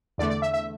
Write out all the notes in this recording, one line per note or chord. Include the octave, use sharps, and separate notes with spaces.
E2 D3 A3 D5
D5
E5
E5